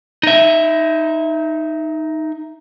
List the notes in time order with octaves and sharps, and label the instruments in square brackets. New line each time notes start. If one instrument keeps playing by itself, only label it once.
[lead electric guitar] D#4 E5